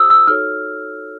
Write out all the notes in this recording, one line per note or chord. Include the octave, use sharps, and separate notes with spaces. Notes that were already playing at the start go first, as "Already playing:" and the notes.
Already playing: F4 G#4 C5 D#6 E6
E6
D#4 F#4 A4 C#5 F6